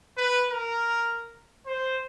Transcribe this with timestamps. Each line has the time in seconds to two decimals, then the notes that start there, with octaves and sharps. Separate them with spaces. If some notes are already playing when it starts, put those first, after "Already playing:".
0.17 B4
0.51 A#4
1.66 C5